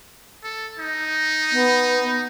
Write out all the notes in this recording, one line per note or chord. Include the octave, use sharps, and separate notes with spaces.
A4
D#4
B3